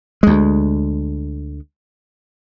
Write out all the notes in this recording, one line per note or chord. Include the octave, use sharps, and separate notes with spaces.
D2 G#3